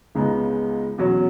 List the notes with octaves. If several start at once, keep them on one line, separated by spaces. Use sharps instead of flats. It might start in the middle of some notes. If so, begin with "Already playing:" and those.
C#2 C#3 G#3 B3 D#4
E2 B2 F#3 C#4